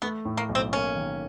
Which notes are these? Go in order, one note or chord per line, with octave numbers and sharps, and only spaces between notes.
A3 B3
A2
A#3
B1
C4
A#3 C#4
D#3